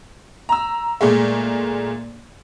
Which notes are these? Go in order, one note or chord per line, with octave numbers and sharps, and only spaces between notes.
A#5 E6
A#2 G#3 A3